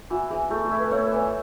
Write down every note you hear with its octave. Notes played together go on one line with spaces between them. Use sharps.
E3 F#4
E3 G#4
A3 G#4
A4
E4
B4
A3 C#5
B4
E3 C#5